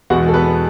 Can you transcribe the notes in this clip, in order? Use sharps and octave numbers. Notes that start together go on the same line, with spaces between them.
E2 B2 G#3 B3 F#4 F#5
A4
B3 B4